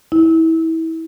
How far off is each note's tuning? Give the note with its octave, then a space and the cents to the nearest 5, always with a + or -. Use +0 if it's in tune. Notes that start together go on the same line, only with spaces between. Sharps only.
E4 -25